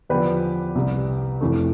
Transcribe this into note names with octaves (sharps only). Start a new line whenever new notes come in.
E2 D3 F3 G4 B4
C2 C3 G3
F1 F2 E3 A3